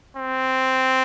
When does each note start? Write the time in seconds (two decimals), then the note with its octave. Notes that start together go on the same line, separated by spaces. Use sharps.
0.17 C4